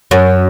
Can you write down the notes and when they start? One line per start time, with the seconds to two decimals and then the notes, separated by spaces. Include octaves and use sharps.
0.11 F#2